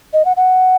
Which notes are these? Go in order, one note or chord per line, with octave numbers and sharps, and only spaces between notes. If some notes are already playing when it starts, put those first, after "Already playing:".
D#5
F#5
F#5